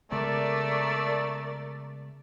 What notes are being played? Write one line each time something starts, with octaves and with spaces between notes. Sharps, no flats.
C#3 G#3 A3 B3 A#4 D5 A6